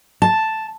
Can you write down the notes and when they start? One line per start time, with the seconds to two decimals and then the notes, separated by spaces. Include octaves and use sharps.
0.22 A5